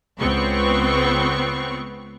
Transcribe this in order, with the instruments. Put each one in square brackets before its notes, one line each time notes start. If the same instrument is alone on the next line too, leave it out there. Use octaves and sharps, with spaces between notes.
[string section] C#2 B3 C4 C#6